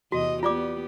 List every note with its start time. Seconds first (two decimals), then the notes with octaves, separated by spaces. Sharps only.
0.12 E2 C3 F#4 D#5
0.43 B3 F4 G4 D5 D6